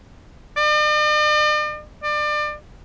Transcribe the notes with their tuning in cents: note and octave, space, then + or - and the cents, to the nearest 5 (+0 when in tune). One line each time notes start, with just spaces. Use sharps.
D5 +45
D5 +30